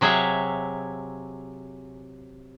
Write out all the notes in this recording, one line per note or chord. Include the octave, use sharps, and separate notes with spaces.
C3 F#3 G#4 C#5 E5 F5